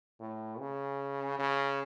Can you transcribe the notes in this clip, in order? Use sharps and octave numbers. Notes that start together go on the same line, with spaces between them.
A2
C#3
C#3